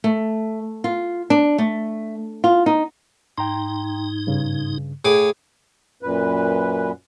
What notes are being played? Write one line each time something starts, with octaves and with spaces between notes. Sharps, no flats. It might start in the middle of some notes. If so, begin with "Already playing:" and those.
A3
F4
D4
A3
F4
D#4
G#2 D#4 G5 A#5 C6
G2 C#3
A2 G#4 D6
F#2 A#2 B4